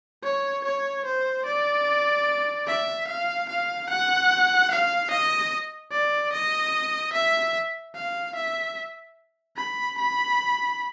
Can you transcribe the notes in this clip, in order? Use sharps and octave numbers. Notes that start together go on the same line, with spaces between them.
C#5
C#5
C5
D5
E5
F5
F5
F#5
F5
D#5
D5
D#5
E5
F5
E5
B5
B5